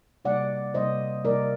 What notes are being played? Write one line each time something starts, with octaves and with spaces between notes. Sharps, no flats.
C3 G3 A#3 D#4 D5 F#5
C3 G3 A#3 D#4 C5 D#5
C3 G3 A#3 D#4 A#4 D5